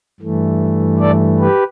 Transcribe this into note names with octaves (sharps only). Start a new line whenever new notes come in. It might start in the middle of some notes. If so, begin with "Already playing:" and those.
G2 E3 A3
A4 D5
G4 B4